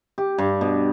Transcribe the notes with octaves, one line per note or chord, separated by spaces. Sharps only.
G4
G2
B2